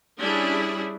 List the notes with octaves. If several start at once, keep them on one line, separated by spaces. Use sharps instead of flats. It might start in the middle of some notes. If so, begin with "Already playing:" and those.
G3 C#4 D4 E4 G#4